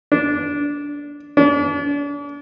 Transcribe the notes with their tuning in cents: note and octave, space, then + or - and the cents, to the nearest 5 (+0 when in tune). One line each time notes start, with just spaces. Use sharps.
D4 -15
D4 -40